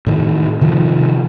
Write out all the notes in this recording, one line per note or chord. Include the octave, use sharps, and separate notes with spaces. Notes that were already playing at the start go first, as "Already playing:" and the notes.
A2 D#3 E3
C3 D#3 F3